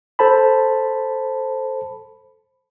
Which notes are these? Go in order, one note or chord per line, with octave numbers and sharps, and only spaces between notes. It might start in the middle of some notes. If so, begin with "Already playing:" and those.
A4 C5 A5 B5